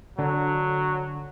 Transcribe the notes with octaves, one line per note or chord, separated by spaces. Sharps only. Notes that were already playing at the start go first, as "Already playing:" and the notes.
D3 F#3